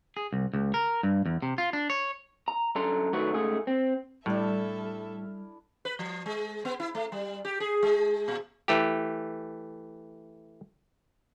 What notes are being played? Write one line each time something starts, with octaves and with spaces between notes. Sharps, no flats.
G#4
C2
C#2
A#4
G2
E2
C3
F4
D4
C#5
A#5
F#2 D3 A4 A#5 C6
D#3 F#3 A3 B3 F#4
C#2 G#2 A3 G#4
C4
A2 G3 D4 E4 A4 E5 F6
B4
F3
G#3
B3
E4
A3
G3
G4
G#4
G#3
A#2
E3 A3 G4